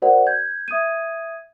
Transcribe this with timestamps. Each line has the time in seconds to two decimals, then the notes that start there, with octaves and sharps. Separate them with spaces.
0.02 F#4 A#4 C5 D5 F#5
0.27 G6 G#6
0.68 E5 D#6 G#6 D#7